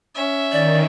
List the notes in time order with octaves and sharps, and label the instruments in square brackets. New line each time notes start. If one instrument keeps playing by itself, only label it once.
[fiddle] C#4 E5
[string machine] D#3 [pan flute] D5